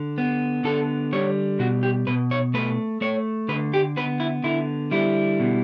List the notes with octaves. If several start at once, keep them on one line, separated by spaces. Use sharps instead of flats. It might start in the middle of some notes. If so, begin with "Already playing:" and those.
Already playing: D3
B3
D3 A4
G3 C#5
B2 F#4
G4
B2 B4
C#5
A3 B4
A3 C#5
D3 B4
G4
B3 B4
E4
D3 E4
G3 E4
B2